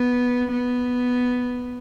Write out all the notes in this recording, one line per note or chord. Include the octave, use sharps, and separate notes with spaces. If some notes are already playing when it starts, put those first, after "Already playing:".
Already playing: B3
B3